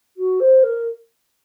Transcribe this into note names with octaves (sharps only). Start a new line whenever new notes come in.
F#4
C5
A#4